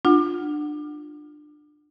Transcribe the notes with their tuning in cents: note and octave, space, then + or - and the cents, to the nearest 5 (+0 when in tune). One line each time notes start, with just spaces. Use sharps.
D4 +25 F4 +10 F#5 +0